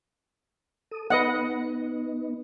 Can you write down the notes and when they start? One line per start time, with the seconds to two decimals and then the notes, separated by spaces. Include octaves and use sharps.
0.91 A4 D#6
1.10 B3 D#4 B4 D#5 F#5